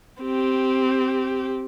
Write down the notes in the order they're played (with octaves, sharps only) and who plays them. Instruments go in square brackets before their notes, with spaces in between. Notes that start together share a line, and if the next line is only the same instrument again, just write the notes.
[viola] C4 G4